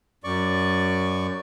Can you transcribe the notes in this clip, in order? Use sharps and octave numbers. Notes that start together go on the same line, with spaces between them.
F#2 D5 C#6